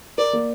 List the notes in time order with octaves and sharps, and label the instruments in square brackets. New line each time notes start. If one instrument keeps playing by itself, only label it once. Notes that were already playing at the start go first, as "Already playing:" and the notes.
[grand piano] A#4 [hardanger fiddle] D5
[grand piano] A#3